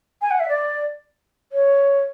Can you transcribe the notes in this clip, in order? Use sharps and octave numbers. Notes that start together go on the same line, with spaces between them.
G#5
F#5
E5
D5
C#5